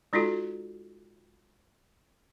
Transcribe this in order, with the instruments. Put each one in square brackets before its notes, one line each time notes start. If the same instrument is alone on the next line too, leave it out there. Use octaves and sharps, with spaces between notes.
[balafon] G#3 D#4 F4 F#4 A4